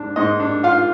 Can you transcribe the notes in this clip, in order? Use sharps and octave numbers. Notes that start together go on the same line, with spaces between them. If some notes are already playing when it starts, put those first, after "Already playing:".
Already playing: G#2 D4
G#2 D#5
D4
F4 F5